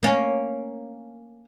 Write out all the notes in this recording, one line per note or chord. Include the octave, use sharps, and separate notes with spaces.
A#3 C#4